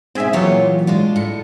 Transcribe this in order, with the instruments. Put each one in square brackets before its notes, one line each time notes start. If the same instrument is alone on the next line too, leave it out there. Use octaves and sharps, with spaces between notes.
[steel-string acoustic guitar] G#2 B2 [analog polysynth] C4 G#4 E5
[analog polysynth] A#2 E3 F#3 [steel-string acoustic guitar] F4 G4 C#5
[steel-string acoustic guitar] G#3 D4 F4
[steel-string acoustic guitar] A2 [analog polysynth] C#7